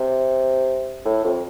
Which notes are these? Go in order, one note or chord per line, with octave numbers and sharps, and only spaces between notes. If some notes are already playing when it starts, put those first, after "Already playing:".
Already playing: C3
A2
F2